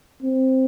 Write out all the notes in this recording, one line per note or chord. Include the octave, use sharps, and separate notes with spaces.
C4